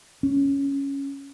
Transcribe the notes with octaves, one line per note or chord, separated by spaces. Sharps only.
C#4